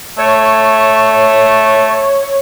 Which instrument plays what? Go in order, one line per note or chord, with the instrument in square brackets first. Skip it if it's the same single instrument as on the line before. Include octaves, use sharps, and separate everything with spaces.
[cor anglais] A3 [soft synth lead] C#5